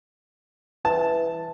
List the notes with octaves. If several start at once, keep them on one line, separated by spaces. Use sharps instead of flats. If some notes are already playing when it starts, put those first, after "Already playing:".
E3 A5